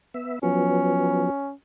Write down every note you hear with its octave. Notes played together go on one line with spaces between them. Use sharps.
B3 E5
F3 F#3 B3 C#4